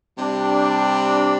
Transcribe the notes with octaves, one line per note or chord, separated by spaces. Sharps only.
C3 G3 D4